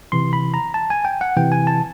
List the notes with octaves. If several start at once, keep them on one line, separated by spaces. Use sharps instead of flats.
C3 E3 C6
B5
A#5
A5
G#5
G5
F#5
C3 E3 G5
G#5
A5